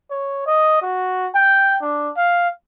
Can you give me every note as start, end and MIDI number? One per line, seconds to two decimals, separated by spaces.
0.11 0.45 73
0.47 0.79 75
0.82 1.28 66
1.35 1.75 79
1.82 2.10 62
2.17 2.48 77